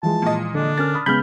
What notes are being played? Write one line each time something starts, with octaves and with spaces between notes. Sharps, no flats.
E3 F3 G#3 A5
A#2 D#5
D3 D4
C#4 A#4 F6 A6
B5 D#6
C#3 G#3 B3 B5 F6 G6